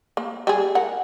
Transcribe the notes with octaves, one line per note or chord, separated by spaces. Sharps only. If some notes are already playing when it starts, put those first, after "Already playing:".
A#3
G3 G#4
A#4 F#5